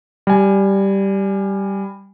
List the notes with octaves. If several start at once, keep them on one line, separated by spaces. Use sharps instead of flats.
G3 G#5